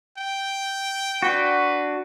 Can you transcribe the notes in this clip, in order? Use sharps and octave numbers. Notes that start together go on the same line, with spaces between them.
G5
D4 F#4 B4